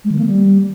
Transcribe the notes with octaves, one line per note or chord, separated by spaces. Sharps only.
G#3
D#3
A#3
G3